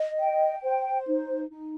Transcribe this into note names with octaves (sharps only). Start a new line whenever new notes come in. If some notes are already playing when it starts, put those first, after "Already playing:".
Already playing: D#5
G5
C5
D#4
D#4